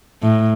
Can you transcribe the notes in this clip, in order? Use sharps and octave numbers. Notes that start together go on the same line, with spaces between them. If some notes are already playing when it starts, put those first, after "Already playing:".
A2